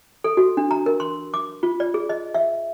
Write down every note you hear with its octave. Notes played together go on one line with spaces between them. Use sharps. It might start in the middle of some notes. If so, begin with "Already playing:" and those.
A4
F#4
D4
A#5
A#4
C6
D6
F4
D5
G#4
D#5
E5